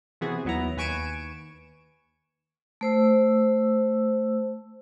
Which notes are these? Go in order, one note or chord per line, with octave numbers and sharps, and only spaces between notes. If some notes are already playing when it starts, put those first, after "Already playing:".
C3 E3 B3 F#4 G#4
D#2 F#3 B3 E4 A#5
D#2 B4 G#5 C#6 D7 E7
A3 C5 E6